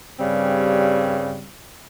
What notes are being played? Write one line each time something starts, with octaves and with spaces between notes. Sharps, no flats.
G2 C#3 G3 C4